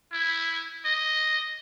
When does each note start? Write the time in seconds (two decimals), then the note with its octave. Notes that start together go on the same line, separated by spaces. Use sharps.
0.12 E4
0.85 D#5